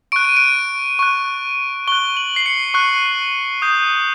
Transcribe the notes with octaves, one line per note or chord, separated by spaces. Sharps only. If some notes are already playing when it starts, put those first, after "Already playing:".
C#6 F#6 D7
D#7
D7
C#6 F#6
C#6 F#6 G7
F#7
C7
C#7
C#6 F#6
D#6 G6